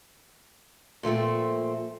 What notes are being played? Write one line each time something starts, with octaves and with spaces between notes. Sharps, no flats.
A#2 F3 A3 C4